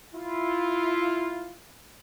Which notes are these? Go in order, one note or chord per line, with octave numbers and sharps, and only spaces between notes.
E4 F4